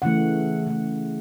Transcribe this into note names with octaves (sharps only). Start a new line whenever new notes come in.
C#3 E3 A3 F#5
C#3 E3 A3